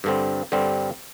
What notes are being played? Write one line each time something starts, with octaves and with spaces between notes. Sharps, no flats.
G2 D3 G3 C4
G2 D3 G3 C4